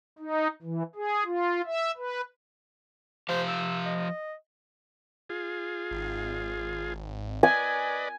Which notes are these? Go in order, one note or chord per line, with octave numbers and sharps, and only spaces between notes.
D#4
E3
G#4
F4
E5
B4
F3 G4 C5 F5
E6
D#5
F4 G#4
G#1
B4 D5 D#5 G#5